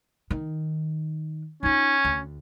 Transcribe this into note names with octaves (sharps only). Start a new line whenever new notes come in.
D#3
C#4 D#4 F4
D2